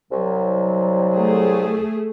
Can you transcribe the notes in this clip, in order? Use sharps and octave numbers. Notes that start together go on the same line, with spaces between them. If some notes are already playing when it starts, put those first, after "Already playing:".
C2 F#3
A3 G#4